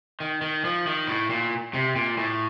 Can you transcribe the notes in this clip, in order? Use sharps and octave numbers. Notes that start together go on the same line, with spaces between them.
D#3
D#3
F3
D#3
A2
A#2
C3
A#2
A2